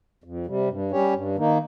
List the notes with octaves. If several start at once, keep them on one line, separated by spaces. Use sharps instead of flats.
F2
C3 G3
G2
G3 C#4 G4 C#5
G2
D#3 A#3 D#4